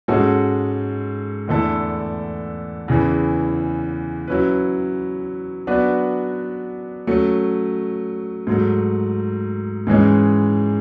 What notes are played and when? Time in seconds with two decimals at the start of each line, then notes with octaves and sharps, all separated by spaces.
0.08 G#2 G#3 C#4 F#4 A4
1.48 E2 D3 A3 E4 A4
2.88 E2 C#3 E3
4.28 F#3 C#4 E4 B4
5.67 F#3 B3 D4 F#4 B4
7.07 F#3 A3 C#4
8.47 G#2 F#3 A3
9.87 G#2 E3 G#3 C#4